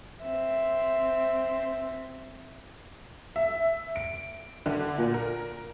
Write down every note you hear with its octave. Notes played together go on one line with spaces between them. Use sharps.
C4 E5
E5
D7
D3
A#2
A#4